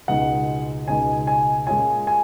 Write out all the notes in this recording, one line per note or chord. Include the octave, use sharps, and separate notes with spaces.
C#2 B2 G#3 D#4 F#5
C#2 B2 G#3 D#4 G#5
G#5
A#2 G#3 C#4 F4 G#5
G#5